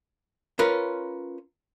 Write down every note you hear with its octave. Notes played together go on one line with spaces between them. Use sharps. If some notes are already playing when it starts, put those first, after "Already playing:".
C#4 F4 A#4 B4